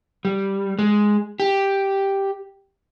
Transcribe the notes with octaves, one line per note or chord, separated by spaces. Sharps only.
G3
G#3
G4